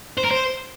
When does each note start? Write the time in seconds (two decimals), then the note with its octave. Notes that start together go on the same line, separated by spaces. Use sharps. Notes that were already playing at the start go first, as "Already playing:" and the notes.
0.17 C5
0.24 A#4
0.31 C5